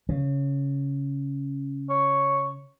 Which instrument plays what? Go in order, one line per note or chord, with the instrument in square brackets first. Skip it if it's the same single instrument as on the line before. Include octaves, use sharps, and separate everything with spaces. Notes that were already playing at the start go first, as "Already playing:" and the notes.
[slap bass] C#3
[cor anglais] C#5